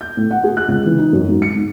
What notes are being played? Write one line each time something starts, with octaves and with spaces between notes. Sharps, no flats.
G6
A2
F#5
G#4
F#6
C#2
E3
D#4
F#2
G#2
C#7
G#2